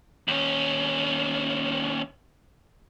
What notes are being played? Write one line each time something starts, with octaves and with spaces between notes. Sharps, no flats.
D#2 C#4